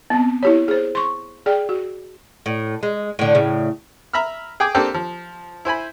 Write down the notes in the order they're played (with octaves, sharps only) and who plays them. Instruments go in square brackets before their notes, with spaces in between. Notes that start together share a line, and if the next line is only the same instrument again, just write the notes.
[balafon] B3 C4
E4 G4 C#5
G#4 C5
C6 C#6
G#4 D5 G5
F#4
[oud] A2
G#3
A2 D3
A2 C#3
[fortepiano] E5 A#5 B5 E6 F6
G#4 G5 G#5 D6
A#3 C4 D4 G4 A4
F3
E4 C5 G#5 B5